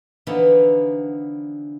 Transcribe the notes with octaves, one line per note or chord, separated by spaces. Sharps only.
D3 E3 F3 B3 D4 D#4